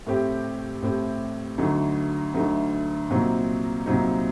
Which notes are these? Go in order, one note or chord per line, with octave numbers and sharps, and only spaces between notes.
A2 A3 C4 G4
A2 A3 C4 G4
D2 D3 F#3 A3 D#4
D2 D3 F#3 A3 D#4
C2 A#2 F#3 C4 D#4
C2 A#2 F#3 C4 D#4